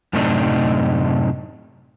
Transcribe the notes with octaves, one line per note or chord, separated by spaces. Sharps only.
F#2 A2 C3 A3 D4 D#4